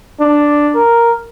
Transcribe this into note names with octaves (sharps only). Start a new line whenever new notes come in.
D4
A#4